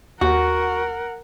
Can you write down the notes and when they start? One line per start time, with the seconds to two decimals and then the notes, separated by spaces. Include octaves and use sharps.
0.21 D#2 F#4 A#4 F#5